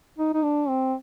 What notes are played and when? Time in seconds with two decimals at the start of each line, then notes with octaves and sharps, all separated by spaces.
0.19 D#4
0.34 D#4
0.43 D4
0.68 C4